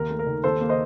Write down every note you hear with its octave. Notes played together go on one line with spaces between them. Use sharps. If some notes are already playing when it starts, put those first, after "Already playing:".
Already playing: D#2 A#4
A3
A#4
D#3
D#2 A4 C5
A#3
C5 D#5